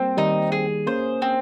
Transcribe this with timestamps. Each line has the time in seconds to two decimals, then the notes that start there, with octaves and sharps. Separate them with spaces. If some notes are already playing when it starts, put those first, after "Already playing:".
Already playing: G3 A#3 C4 C5
0.17 D#3 G3 D#4
0.52 G#4
0.87 A#3 C#4 C5
1.22 C4